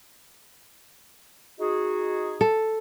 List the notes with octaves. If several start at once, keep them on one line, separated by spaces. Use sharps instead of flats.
D#4 F#4 G#4
A4